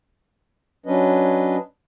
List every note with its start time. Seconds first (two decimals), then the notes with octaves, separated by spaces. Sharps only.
0.86 F#3 C#4 D4 B4 D#5